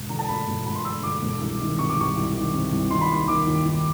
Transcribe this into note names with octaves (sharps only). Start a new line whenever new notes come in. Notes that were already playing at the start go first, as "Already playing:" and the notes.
Already playing: E1
D3 A#5
A5
D2 B5
E1
E1 B5
C6
D3 E6
D2 D6
E1
C2
D#3
C3 C#6
D6
C2 C#6
C2
D#3
C3
C2
D#3 C6
B5
D#2 C6
D#3 D6
D#2
D#3